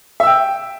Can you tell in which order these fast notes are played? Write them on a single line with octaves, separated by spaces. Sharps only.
E5 E6 G5